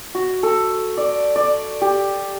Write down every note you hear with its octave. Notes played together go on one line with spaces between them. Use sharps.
F#4
A4
D5
D5
G4